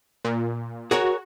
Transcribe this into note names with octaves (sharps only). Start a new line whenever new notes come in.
A#2
F#4 G#4 A#4 C#5